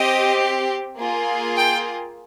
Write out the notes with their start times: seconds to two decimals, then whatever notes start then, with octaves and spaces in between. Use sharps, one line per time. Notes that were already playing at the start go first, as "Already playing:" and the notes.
Already playing: C4 G4 D#5
0.97 A#3 F4 G#4
1.57 G5